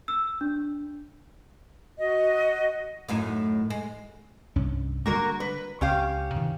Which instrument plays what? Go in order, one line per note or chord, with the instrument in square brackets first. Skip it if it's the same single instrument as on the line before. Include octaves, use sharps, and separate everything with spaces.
[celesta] E6
D4
[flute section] F#4 D#5
[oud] F#2 A2 D#4
G#3
[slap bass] C2 G2 C#4
[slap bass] D3 G3 G#3 [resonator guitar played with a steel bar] A#3 F#4 A#4
[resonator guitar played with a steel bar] B4
[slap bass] C#2 [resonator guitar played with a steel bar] C#4 G4 F5
[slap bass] C3 D#3 E3